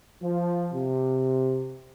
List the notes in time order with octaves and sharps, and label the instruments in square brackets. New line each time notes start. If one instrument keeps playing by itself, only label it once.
[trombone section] F3
C3